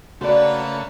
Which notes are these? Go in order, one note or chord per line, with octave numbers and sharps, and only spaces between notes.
C#3 A3 A#3 D4 F#4 B4 D5